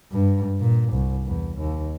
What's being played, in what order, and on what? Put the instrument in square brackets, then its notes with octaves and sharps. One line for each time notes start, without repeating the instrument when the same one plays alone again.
[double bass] G2
A#2
C2
E2
D#2